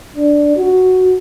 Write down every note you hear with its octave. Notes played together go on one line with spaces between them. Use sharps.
D4
F#4